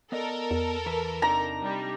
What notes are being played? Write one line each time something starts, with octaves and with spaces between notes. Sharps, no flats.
B3 A4 A#4 D5 D#5
E2
E3 B4
C3 D4 D#4 A#5
G3